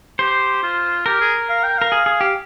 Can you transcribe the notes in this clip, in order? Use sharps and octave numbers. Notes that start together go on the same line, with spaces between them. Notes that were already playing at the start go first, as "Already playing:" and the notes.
G4 C5
F4
G4 A#4
G#4
F5
G5
A#4 F5
G#4
G#4
G4